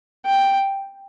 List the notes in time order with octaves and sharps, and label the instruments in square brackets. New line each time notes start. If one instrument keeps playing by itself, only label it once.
[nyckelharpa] G5